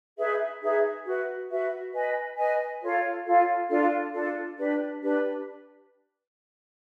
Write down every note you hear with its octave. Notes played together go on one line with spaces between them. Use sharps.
D#4 G#4 B4 E5
D#4 G#4 B4 E5
F#4 B4 E5
F#4 B4 E5
B4 D#5 G#5
B4 D#5 G#5
F4 A4 C#5 F5
F4 A4 C#5 F5
D4 F4 A4
D4 F4 A4
D4 G4 B4
D4 G4 B4